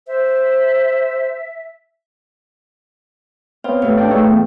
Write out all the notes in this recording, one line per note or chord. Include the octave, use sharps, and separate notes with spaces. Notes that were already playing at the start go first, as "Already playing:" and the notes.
C5 E5
B3 C4 C#5 F5
A2 G4 B4
D4 G5
A3 D#4 G#4 C#5
E2 B3